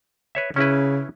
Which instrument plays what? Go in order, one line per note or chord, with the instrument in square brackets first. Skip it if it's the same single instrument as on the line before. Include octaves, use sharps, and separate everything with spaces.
[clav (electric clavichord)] B4 C#5 E5
[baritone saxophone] C#3 [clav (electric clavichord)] C#4 E4 B4